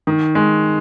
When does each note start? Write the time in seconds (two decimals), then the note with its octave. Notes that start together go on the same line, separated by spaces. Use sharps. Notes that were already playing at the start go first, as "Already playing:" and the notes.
0.07 D#3
0.35 G#3